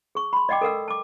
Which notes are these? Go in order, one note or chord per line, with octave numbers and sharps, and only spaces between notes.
G#4 C#6
B5 C6
D5 D#5 F#5 G5 D6
A4 A#4 F#5 E6
A5 D6